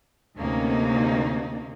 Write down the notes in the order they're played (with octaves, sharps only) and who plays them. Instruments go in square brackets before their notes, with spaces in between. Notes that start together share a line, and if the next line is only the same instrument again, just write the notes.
[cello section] D2 C3 A#3 C#4 D#4